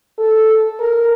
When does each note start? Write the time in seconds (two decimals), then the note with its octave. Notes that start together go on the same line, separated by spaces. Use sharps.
0.18 A4
0.80 A#4